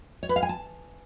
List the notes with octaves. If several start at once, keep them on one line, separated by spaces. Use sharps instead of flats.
C#5
B4
F5
G#5
A5